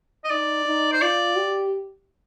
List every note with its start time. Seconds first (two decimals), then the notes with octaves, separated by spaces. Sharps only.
0.24 D#5
0.30 D#4 D5
0.66 D#4
0.93 C5
1.01 F4 D5
1.37 G4